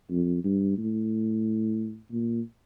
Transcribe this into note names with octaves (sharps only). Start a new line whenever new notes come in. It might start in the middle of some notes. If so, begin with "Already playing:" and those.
F2
G2
A2
A#2